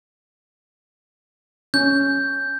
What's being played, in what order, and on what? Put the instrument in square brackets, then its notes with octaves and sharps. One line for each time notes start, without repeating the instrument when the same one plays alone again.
[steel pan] C#4 [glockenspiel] G6